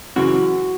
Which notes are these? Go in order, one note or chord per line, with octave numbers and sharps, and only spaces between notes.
F#2 C#3 E3 F#4